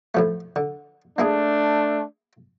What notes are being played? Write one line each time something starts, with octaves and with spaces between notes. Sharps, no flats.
A2 F3 A3
D3
A3 A#3 D4 E4 G#4